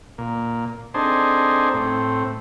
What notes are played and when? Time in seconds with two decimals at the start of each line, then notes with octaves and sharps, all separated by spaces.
0.18 A#2
0.94 C4 D4 D#4 G#4 A4 C5
1.74 A2 C4